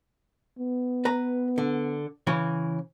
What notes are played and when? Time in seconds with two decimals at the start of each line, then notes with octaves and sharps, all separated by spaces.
0.59 B3
1.05 B4 A#5
1.58 D3
2.27 C#3 E3 C#5